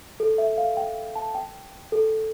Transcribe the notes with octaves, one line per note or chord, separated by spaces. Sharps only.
A4
E5
F5
G5
A5
G5
A4